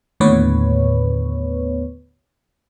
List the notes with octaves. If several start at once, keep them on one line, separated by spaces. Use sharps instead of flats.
D#2 A2 D3 B3 B4 C#5